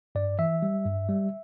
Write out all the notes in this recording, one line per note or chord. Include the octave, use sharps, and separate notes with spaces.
G2 D5
E3 E5
G3
G2
G3